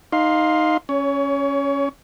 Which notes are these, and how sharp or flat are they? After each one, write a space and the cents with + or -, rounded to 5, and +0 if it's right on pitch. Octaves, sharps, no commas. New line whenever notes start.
D#4 +0 F5 +15 C6 +0
C#4 +0 C#5 +25